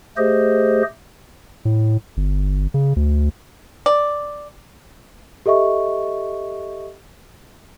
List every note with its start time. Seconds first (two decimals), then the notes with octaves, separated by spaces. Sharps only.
0.17 A3 G4 G#4 C5 D#5
1.65 A2
2.17 G1
2.74 C#3
2.96 D2
3.86 D5
5.46 G4 A4 D#5 E5 C#6